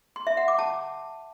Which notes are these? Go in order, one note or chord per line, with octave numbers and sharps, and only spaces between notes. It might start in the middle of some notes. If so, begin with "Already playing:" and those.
C6
E5
F#5
D6
A5